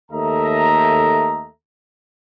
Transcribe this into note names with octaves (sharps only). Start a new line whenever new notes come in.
D#2 A3 A4 D#5 E5 A#5